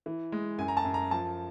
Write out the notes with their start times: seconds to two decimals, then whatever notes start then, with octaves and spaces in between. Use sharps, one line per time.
0.06 E3
0.32 G#3
0.58 F#2 G#5
0.68 A#5
0.77 A5
0.85 F#2
0.94 A#5
1.11 F3 A5